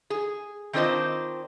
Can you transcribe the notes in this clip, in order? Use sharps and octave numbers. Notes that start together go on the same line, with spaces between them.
G#4
D#3 C4 D4 F4 C5 D#5